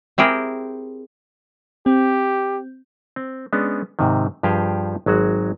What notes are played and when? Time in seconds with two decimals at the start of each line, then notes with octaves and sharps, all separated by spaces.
0.18 C4 E4 G4 G#4 A#4
1.86 C4 G4
3.16 C4
3.53 G#3 B3 C#4 D4
3.99 G#2 C3 D#3
4.43 G2 F3 G4 G#4 F5 G5
5.06 G#1 F#3 G#3 F#4